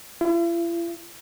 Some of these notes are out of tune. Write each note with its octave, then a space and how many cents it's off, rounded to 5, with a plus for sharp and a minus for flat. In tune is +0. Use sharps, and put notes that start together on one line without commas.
E4 +45